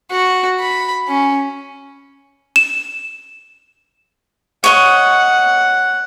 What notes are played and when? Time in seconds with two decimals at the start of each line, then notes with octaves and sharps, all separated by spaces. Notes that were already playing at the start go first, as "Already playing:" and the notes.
0.11 F#4
0.60 B5
1.08 C#4
2.56 E7
4.64 C#5 D#5 F#5 C#6